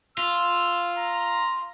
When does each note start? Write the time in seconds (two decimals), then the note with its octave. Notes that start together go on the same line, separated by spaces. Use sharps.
0.18 F4 E6
0.99 A#5